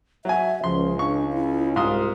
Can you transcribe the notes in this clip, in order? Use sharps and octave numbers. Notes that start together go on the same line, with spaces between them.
F#3 E5 G#5
C#2 F3 C6
D4 C#6
E4
C2 G#2 F4 F5 C6 D#6